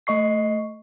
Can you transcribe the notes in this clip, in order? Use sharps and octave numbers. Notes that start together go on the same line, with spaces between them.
A3 D#5 C#6 C7